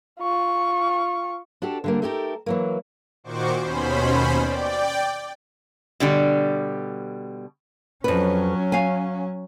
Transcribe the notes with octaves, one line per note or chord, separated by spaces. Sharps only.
F4 C#6
D4 F#4 G4 A4
D3 G3 A#3
A3 D#4 G4 A4 A#4
E3 F#3 A#3
A#2 D#3 F#4 C5 C#6 D6
D#2 B2 C#4 C5 B5
D5 G5
B2 D3 G3
F2 F#3 C#4 B4
F5 G#5